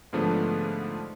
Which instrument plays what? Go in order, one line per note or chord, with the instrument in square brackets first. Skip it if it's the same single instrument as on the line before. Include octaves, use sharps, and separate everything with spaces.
[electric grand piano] G#2 D3 F3 A3 B3 D4